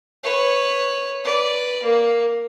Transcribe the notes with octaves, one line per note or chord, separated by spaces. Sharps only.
B4 C#5
B4 D5
A#3